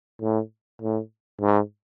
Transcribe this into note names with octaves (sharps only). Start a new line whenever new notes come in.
A2
A2
G#2